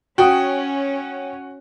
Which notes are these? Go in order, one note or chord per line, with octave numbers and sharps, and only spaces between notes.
C#4 F#4 G5 D#6